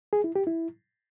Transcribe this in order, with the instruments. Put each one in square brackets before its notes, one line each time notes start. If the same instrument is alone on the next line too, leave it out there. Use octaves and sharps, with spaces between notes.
[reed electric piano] G#4
E4
G4
E4